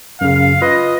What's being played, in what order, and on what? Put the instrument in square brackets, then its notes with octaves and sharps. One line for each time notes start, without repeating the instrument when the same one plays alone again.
[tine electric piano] F#2 C#3 [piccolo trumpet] F5
[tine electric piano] F4 B4 [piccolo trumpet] D#5